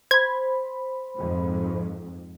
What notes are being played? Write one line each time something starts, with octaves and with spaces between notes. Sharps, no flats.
C5 B5 G#6
F2 G#2